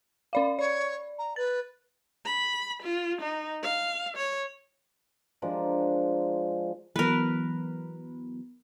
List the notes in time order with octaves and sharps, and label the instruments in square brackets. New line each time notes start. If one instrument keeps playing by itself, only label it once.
[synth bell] C#4 D5 F5
[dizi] C#5 [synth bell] D5
[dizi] A#5
[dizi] B4 [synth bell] A6
[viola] B5
F4
D#4
F5
C#5
[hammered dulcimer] F3 G#3 D4 A#4
[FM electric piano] E3 F#3 B3 [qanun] A#4 B4